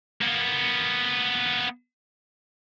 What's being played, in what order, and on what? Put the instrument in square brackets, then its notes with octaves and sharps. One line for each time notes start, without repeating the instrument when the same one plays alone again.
[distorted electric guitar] A#3 B3